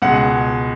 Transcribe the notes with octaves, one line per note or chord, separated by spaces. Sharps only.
C#2 B2 G#3 F#5